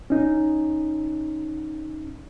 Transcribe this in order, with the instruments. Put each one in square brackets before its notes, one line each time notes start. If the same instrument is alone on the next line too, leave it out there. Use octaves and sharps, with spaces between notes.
[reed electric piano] C#4 D#4